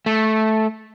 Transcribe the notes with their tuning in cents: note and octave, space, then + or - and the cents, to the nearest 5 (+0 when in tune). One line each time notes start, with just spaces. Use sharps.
A3 -10